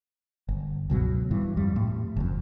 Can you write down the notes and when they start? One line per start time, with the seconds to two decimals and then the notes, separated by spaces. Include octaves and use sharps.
0.49 G1
0.90 C#2 B2 F#3
1.31 G2 E3
1.57 F2 G3
1.76 A2
2.17 F#1 F2